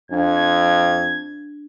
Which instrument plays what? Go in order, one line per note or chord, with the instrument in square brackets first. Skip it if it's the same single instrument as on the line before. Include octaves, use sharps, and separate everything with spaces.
[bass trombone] F2 [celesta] D4 [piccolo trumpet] G#6